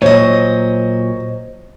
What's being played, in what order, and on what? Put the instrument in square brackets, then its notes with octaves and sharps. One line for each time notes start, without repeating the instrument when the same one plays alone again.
[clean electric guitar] A#2 F#3 [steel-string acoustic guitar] C5 D#5 [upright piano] C#5